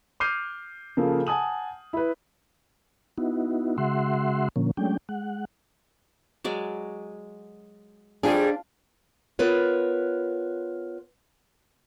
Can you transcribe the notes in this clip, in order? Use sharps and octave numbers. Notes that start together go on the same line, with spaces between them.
D6 F6 G6 C7 D#7
C#3 F3 A#3 G#4 A4
F#5 G#5 A5 D#6 F#7
E4 B4
B3 D#4 E4 F#4
C#3 G#3 F#4 E5 F#5 C6
A#2 D3 F3 A#3 C#4
F#3 G#3 A3 C#4 D4 G5
G#3 F#5
F#3 G#3 D5
F2 G3 D4 F4 G#4
B3 F4 A#4 B4 C#5